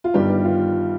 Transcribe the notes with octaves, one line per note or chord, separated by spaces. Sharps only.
F4
G1 G2 D#3 G3 G4
F4